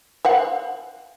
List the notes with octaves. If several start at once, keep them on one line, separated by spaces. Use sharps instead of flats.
C5 F5 F#5